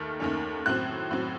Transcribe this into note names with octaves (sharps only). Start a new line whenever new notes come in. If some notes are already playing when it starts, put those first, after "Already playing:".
Already playing: D#2 D#3 A3 F6
D#2 D#3 A3 C#4
A2 F#3 C4 F#6
A2 F#3 C4